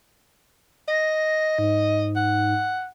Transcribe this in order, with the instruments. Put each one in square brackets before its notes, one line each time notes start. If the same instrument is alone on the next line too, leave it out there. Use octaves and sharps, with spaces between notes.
[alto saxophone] D#5 [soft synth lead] A#6
[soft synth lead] G#2
[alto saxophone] F#5